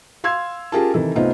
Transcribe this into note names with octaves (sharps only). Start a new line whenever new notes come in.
F5 C6 E6 G#6
C#4 F4 G4 G#4 A#4 A5
C3 D#3 E3 A4
C2 A3 B3 D#4 F4 C5